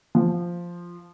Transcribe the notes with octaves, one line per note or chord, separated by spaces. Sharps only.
F3